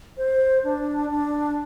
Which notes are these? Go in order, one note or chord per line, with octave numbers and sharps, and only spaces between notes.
C5
D4
D4